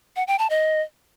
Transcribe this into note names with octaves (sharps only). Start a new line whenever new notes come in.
F#5
G5
A5
D#5